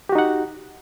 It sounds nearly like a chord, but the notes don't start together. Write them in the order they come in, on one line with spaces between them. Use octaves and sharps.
G4 F#4 D#4 F#5